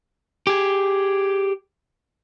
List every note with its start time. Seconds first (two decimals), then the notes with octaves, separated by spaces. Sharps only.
0.47 G4 G#4